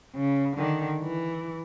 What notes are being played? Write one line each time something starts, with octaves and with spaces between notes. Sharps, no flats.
C#3
D3 D#3
E3